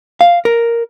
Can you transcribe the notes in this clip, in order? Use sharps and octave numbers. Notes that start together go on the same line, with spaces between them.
F5
A#4